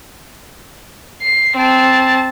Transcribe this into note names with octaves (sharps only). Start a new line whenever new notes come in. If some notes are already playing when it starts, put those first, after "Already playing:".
C7
C4 A5